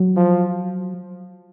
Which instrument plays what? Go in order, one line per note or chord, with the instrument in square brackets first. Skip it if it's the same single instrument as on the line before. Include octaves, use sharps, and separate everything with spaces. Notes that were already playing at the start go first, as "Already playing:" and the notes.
Already playing: [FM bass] F#3
[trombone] F3